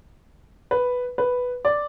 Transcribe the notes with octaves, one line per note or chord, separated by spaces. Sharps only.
B4
B4
D5